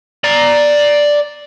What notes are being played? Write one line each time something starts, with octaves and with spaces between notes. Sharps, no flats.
D5 A#5